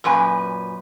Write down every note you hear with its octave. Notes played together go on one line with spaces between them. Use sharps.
F#2 A#2 B4 G#5